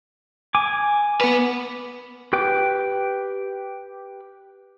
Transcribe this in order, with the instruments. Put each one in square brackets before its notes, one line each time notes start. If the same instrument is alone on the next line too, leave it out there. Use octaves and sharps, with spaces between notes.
[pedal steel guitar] G#5 D6
[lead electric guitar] B3 B4
[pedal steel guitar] G4 B4 G5 D6